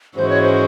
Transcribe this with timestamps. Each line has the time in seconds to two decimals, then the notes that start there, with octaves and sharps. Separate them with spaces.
0.17 G#2 E3 G#3 C#4 F#4 C5
0.29 C#5
0.42 C5